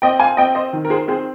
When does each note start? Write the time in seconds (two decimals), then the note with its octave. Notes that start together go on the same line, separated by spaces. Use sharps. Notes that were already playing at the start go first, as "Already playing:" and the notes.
0.02 C4 D#5 G5
0.19 F5 G#5
0.37 C4 D#5 G5
0.55 C5 D#5
0.73 D#3
0.85 A#4
0.90 G#4 C5
1.08 C4 G#4 C5